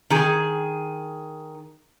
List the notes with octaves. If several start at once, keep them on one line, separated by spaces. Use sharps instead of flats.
D#3 G#4